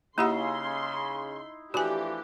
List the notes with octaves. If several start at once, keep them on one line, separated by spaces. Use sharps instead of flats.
C#3 A#3 D#4 E4 G4 F#5 C6
E3 F3 A3 D4 F#4 G4 B4 G#5